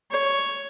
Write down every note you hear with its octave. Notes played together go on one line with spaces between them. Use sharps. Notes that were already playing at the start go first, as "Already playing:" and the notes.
C#5